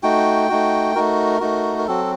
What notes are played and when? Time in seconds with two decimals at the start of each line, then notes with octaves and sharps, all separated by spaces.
0.03 A3 D#4 F#4 G5
0.49 A3 D#4 F#4
0.95 A3 D#4 F#4 A#4
1.41 A3 D#4 F#4
1.78 A#4
1.87 F#3 C4 F#4 A4